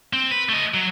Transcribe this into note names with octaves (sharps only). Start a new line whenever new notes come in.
C4
B4
A3 D#5
F#3